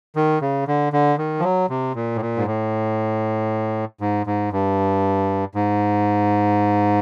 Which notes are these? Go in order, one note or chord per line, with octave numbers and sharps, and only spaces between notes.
D#3
C#3
D3
D3
D#3
F3
F#3
C3
A#2
A2
A#2
G#2
A2
G#2
G#2
G2
G#2